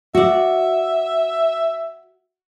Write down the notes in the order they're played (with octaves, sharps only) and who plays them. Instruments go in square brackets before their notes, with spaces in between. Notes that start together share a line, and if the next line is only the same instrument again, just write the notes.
[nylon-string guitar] F#4 D5 [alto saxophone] E5